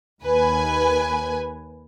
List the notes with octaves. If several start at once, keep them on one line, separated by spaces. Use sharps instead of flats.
D#2 B4 G#5